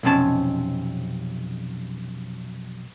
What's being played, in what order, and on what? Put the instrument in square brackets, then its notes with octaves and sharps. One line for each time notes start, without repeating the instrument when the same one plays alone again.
[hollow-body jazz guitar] B1 F2 C3 C#4 A5